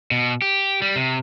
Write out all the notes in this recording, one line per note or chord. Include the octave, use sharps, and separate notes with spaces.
B2
G4
G3
C3